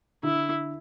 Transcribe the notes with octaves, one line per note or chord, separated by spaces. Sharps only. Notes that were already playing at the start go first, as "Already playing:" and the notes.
D3 E4